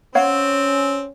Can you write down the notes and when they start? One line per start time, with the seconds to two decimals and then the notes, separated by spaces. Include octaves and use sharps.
0.15 C4 C#4 C#5 F5 F#5